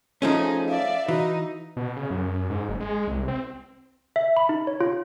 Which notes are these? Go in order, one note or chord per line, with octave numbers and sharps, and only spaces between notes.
F3 A3 C#4 D#4 G#4
D5 E5 F5
E3 D#4 F#4
B2
C#3
F#2
G#2
F#1
G#3
C2
C4
E5
B5
D#4
C#5
F4